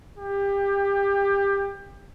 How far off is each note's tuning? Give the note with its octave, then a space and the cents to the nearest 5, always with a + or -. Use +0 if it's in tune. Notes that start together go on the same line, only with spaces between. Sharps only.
G4 +25